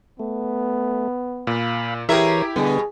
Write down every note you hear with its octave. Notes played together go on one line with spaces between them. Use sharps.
A3 B3
A#2 F5 B5
E3 E4 G4 G#4 A#4 C#5 E5
B2 D3 G3 B3 G#4